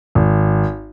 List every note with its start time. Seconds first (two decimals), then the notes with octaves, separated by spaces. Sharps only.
0.15 G#1